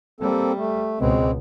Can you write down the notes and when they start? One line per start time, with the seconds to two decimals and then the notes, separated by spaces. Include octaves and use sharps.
0.21 G3 A#3 C4 A4
0.57 A3
0.99 C#2 B2 G#3 C4